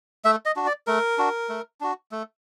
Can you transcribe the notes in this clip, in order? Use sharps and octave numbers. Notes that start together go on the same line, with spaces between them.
A3 E5
D#5
D4 F#4
D5
A3 A#4
D4 F#4
A3
D4 F#4
A3